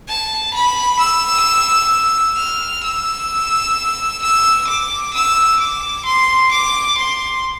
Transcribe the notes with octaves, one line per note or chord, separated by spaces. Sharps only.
A5
B5
E6
F6
E6
E6
D6
E6
D6
C6
D6
C6